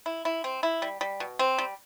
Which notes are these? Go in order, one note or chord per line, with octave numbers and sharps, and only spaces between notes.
E4
E4
C4
E4
G3
G3
B2
C4
G3